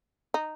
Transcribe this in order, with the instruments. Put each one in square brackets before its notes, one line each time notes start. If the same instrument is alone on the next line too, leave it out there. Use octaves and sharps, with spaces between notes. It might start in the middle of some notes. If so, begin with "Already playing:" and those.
[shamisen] D#4